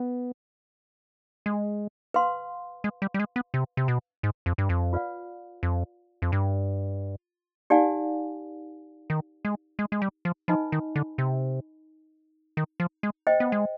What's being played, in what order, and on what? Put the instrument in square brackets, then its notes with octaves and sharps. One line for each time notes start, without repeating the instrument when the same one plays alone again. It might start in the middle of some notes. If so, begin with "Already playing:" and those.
Already playing: [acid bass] B3
G#3
[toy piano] B4 F5 C6
[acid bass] G#3
G3
G3
G#3
B3
C3
C3
B2
G#2
F2
G2
F2
[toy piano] F4 B4 D5 F5
[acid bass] F2
F2
G2
[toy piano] D#4 G4 D5 F5 G#5
[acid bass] D#3
G#3
G#3
G#3
G3
F3
[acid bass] F3 [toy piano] D#4 B4 D#5 G#5 B5
[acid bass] D#3
D3
C3
D#3
F3
G#3
[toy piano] C5 D#5 G5
[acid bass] B3
G#3